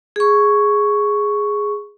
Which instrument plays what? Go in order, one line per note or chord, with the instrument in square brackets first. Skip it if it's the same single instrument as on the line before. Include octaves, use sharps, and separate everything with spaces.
[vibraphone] G#4 C#6